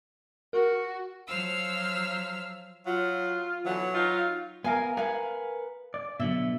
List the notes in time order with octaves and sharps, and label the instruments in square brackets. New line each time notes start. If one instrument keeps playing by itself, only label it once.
[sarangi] F#4 [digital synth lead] A#4
[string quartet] F3 F#3 C5 F5 E6 F6
[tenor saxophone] F#3 [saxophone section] F4
[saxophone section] B2 D3 E3 [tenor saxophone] F#3
[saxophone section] D#4 F4
[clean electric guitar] B3 A#4 [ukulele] F5 G#5
[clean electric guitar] A#4 B4 F#5 [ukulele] F5 G#5
[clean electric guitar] D5
[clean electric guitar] B2 D3 F#3 [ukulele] E5